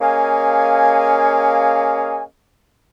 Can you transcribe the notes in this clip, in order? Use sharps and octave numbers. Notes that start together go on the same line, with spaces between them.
A#3 C#4 G#4 D#5 F5 G#5